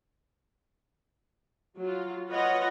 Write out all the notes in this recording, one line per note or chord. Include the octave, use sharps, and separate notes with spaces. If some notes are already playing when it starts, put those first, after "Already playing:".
F#3 F4
F4 B4 C#5 D#5 F#5